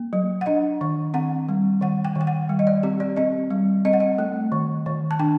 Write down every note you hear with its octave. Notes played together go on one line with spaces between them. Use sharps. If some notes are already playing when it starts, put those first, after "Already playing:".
Already playing: A#3
F#3
F#5
D4 D#5
D#3
C4 F#5
G3
D#3 F#5
G5
D#3
G5
F#5
G3
D#5
D5
C4 G4
D5
C4 D#5
G3
C4 D#5
F#5
D#5
A3
D#3
D#3
A5
D4 G5